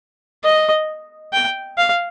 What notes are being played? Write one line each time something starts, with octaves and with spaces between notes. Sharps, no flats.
D#5
G5
F5